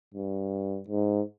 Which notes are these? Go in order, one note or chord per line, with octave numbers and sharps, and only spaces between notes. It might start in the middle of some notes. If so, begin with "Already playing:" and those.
G2
G#2